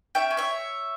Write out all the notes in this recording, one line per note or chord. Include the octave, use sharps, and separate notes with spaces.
C#4 E5 G5
C#4
C#5 E5